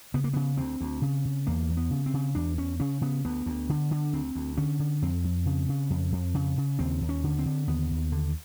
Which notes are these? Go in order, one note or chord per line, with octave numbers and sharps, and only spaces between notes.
C#3 B3
A#3
C#3 B3
D2 C4
D2
C#3
C#3
E2 A#3
E2
B3
C#3
C4
C#3
E2 D4
E2 C#4
C#3 C#4
C#3 B3
D2 B3
D2
D3
D3
D2 C4
D2
D3 C#4
D3
F2 C4
F2
C#3
C#3
F2
F2
C#3
C#3
D#2 C4
D#2
C#4
D3
C4
D3
D#2 B3
D#2
D3